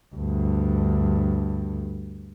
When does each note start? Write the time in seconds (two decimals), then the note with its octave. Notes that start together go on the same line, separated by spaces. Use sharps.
0.15 D2 G2